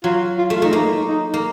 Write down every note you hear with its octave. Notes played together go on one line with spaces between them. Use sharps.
F#3 F4
F4
A3
F4
A3 D#4
A#3 D#4
D#4
A#3